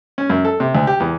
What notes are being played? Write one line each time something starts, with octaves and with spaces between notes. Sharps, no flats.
C#4
F#2
A4
C3
D2
G4
E2